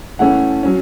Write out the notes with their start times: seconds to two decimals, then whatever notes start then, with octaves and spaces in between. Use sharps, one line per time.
0.19 E3 A3 C#4 F#5
0.63 F#3 C#4